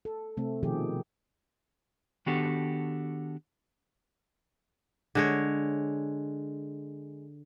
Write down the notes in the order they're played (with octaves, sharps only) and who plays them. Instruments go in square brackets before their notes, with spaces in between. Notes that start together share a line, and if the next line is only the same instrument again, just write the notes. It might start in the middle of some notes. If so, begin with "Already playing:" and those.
[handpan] A4
C3 A3 C4
B2 D#3 F3 G4 G#4
[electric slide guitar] D#3 B3 D4 F#4 G4 A4
[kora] D3 G#3 C#5